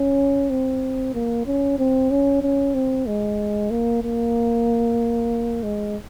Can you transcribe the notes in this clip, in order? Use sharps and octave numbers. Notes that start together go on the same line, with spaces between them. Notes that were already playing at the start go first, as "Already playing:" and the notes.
Already playing: C#4
C4
A#3
C#4
C4
C#4
C#4
C4
G#3
A#3
A#3
G#3